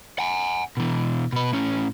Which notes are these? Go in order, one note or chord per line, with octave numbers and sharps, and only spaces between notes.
F#5 G#5
B2 E3
B2 B4
A2 C#4